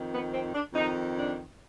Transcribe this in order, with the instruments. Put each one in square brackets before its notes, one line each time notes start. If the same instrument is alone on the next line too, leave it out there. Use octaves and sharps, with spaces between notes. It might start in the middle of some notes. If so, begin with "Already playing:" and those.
Already playing: [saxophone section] F2 D#3
B3
C4
D4
F2 D#3 D#4
D4